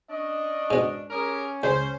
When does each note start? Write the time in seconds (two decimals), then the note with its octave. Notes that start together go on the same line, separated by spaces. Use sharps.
0.10 C#4 D4 D#5
0.70 G#2 B2
1.10 C#4 G4 G#4 A#4
1.63 C#2 C5